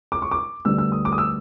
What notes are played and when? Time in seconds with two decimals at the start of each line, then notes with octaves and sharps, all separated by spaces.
0.12 D6
0.22 C#6
0.31 D6
0.65 D2 D3 G3 B3 E6
0.78 E6
0.92 D#6
1.05 D6
1.12 D#6
1.18 E6